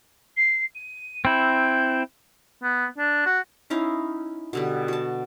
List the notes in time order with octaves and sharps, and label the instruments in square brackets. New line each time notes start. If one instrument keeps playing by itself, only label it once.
[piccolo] C7
D#7
[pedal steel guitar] C4 E4 [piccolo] G6
[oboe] B3
D4
F#4
[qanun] C#4 D#4 E4 F5
B2 D3 G3
F#4 A5